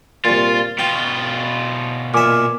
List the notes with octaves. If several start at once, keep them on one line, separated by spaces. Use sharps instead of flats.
C2 A#2 F4 A6
B2 F4 G5
A#2 E5 G#5 D6 F6